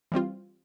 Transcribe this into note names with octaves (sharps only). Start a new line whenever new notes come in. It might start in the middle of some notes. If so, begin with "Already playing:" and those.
E3 G3 C4 F4